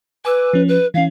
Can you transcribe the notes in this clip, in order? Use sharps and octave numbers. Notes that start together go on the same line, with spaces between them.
B4 G#5 D6 E6
F3 C#4
B4
E3 C#4 F5